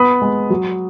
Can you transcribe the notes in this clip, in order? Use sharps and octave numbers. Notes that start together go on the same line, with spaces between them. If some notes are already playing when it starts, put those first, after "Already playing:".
Already playing: B3 B5 D#6
G#3
F#3